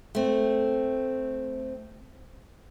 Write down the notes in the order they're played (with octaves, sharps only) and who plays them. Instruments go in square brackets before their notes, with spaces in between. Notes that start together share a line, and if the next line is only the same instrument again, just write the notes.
[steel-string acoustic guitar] A3 C4